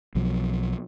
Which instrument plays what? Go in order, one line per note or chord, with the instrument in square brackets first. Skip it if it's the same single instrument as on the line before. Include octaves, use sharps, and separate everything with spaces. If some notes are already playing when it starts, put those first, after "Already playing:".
[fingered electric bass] B1 B2 F3 F#3